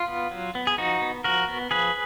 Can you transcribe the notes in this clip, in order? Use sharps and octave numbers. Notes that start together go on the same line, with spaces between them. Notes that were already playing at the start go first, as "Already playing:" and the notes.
Already playing: F4
B3
F#3
B3
G#4
F3 D#4 F#4
B3
F3 F#4 A#4
B3
F3 G#4 B4